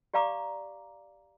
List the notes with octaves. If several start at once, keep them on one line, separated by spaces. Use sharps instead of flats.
G4 D5 F5 A#5 D6